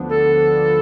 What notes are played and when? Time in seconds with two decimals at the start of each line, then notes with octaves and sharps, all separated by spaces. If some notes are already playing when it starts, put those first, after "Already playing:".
Already playing: D2 D3 F3 B3 D4
0.10 A4